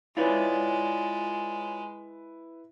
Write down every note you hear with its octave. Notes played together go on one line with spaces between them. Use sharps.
G#3 E4 F4 B4 C#5 D5